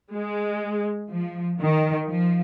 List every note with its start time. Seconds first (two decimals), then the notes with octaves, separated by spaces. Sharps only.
0.13 G#3
1.10 F3
1.60 D#3
2.08 F3